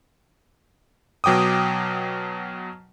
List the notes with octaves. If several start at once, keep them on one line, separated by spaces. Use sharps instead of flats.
B2 F#3 G5 D6 D#6